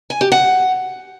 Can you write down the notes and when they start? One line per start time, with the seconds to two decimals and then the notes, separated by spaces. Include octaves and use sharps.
0.10 G#5
0.21 G4
0.32 F#5